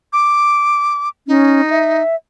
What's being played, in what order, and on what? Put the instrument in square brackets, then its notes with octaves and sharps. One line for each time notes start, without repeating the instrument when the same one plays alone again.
[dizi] D6
[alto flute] C#4 [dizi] D#4
[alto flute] E5